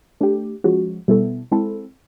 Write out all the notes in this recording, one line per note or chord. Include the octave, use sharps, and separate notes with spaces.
A3 D4 G4
F3 G#3 C#4 F#4
B2 G3 B3 E4 A4
G#3 C4 E4 A4